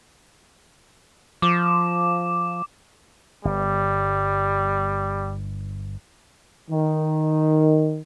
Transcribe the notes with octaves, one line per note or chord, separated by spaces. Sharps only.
F3 D6
G1 G3
D#3